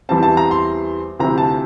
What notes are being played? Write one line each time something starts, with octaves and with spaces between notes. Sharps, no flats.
E2 E3 G3 C4 A5
A5
A#5
C6
D2 C3 F3 C4 E4 A#5
A5